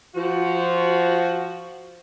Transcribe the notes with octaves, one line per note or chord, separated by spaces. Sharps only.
F3 F#4